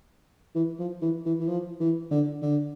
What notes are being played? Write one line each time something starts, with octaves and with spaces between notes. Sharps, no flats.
E3
F3
E3
E3
E3
F3
E3
D3
D3